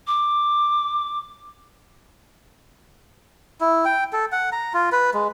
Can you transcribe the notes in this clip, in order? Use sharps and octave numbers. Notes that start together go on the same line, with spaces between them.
D6
E4
G5
A4
F#5
A#5
F4
B4
G#3